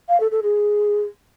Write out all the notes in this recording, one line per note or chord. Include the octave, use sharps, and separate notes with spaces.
F5
A4
A4
G#4